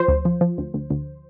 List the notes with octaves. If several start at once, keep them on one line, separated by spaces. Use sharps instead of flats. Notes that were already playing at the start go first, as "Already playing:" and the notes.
Already playing: F3 C5
D2
F3
F3
D2
D2
D2